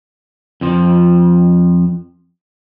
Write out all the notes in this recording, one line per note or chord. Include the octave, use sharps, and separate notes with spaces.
F2 F3